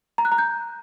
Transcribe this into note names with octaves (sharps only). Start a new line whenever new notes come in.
A#5
F#6
A#5
G6